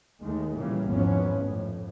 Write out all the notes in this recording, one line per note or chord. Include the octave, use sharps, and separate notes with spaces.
D#2 D#3 G#3 A3
A#2 C#3 E3 G3 A#3
G#1 E2 F3 B3 C#4
F2 A2